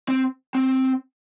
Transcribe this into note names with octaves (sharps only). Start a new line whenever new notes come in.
C4
C4